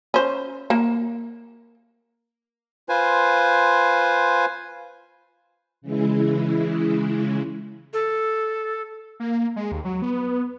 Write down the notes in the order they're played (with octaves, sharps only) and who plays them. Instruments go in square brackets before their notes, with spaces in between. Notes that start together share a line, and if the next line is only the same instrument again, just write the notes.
[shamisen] C#4 C5
A#3
[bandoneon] F4 B4 C5 G#5
[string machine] C#3 E3 G#3 E4
[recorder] A4
[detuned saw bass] A#3
G#3
D#2
F#3
B3